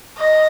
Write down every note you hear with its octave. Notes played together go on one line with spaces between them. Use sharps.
D#5